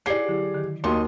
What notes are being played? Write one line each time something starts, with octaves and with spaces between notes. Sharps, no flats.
E4 G4 G#4 C#5 D5 F#5 C7
D3 F#3 E4
D3 D#3
D#2 A#3 D#4 F#4 G4 D#5 C6